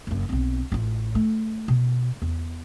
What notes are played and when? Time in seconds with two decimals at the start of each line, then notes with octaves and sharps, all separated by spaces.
0.07 F#1 F#2
0.29 B1 C4
0.72 A1 F4
1.15 A3
1.68 B2
2.22 E2